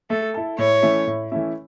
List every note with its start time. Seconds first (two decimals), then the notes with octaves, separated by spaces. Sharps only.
0.10 A3 A4
0.34 E4 A4
0.59 A2 C#5
0.82 E3 A3 C#4 E4
1.07 A2
1.32 E3 A3 C#4 E4